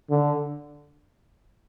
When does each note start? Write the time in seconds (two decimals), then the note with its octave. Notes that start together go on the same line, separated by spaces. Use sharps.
0.10 D3